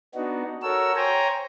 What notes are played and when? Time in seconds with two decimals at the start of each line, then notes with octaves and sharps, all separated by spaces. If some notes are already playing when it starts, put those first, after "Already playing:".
0.15 B3 D4 D#4 F#4
0.62 F#4 A4 A#4 C#5 E6
0.96 C5 C#5 G5 G#5 A#5